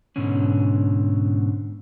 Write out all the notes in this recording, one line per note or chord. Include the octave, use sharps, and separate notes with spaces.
G#2 B2 D3 C#4